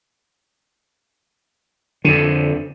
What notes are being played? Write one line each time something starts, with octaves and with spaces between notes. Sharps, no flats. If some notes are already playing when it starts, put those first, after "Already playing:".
F2 D3